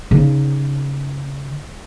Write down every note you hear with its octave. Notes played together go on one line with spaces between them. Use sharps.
C#3 D#4